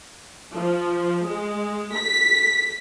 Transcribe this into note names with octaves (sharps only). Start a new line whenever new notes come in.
F3
G#3
B6